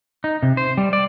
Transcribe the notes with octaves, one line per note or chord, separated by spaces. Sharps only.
D#4
C3
C5
G3
D5